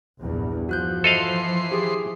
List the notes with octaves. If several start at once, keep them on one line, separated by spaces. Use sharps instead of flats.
A#1 E2 G2
F3 F#4 F#6 G6
E3 A4 D#5 F5 C6
G4 G#4